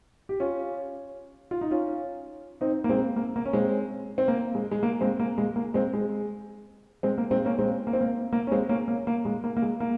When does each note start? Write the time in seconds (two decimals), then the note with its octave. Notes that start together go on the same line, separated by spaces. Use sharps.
0.29 G4
0.40 C#4 F4
1.51 F4
1.61 D#4
1.71 C#4 F4
2.61 C4 D#4
2.84 A#3
2.89 G#3 C4
3.16 A#3
3.36 A#3
3.46 C#4
3.53 G#3 C4
4.18 C4
4.28 A#3
4.55 G#3
4.71 G#3
4.83 A#3
5.01 G#3 C4
5.20 A#3
5.38 G#3
5.56 A#3
5.74 G#3 C4
5.93 G#3
7.03 G#3 C4
7.18 A#3
7.31 G#3 C4
7.45 A#3 C#4
7.58 G#3 C4
7.87 A#3
7.93 C4
8.01 A#3
8.33 A#3
8.47 C#4
8.51 G#3 C4
8.69 A#3 C#4
8.88 A#3
9.07 A#3
9.25 G#3
9.44 A#3
9.57 A#3
9.62 G#3
9.80 A#3